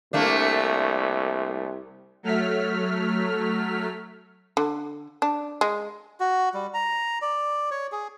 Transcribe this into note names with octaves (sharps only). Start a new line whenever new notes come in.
C2 A3 A#3 D4
F#3 A3 F6 B6
D3
D4
G#3
F#4
G3
A#5
D5
C#5
G#4